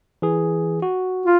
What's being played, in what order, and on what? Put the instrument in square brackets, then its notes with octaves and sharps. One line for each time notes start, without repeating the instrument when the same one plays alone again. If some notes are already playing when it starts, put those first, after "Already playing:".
[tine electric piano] E3 G#4
F#4
[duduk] F4